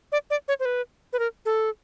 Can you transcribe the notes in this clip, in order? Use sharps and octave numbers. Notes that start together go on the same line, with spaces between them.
D5
D5
C#5
C5
B4
B4
A#4
A4